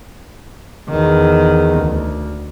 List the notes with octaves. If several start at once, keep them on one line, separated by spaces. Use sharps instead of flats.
E2 D#3
D2